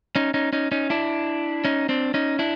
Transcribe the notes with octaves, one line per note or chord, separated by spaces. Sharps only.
C#4 D#4
C#4 D#4
C#4 D#4
C#4 D#4
D4 E4
C#4 D#4
C4 D4
C#4 D#4
D4 E4